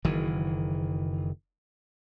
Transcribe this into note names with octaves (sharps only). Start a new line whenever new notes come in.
F#1 D#3 E3